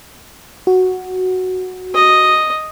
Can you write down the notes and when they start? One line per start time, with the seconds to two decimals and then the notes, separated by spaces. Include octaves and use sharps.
0.67 F#4
1.94 D#5